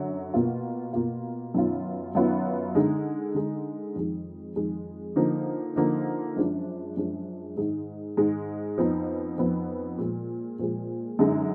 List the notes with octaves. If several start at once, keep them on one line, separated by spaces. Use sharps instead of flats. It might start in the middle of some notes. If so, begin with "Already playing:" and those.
Already playing: F#2 D3 F#3
B2 A#3 F4
B2 A#3 F4
F#2 D#3 F#3 B3 F4
F#2 D#3 F#3 B3 F4
D3 G#3 D#4
D3 G#3 D#4
F2 D#3 G#3
F2 D#3 G#3
D3 F3 A#3 D#4
D3 F3 A#3 D#4
F#2 F3 G#3 D4
F#2 F3 G#3 D4
G#2 D#3 G#3
G#2 D#3 G#3
F2 F3 B3 D#4
F2 F3 B3 D#4
A#2 F3 G#3
A#2 F3 G#3
F#2 D3 G#3 D#4